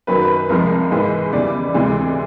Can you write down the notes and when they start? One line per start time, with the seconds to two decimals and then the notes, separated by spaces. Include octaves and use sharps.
0.07 F#2 D#3 F#3 B4
0.22 B4
0.49 C2 C3 F3 G#3 A#4
0.91 G#2 E3 G#3 B4
1.32 E2 C#3 E3 G3 D5
1.74 D2 C3 E3 G#3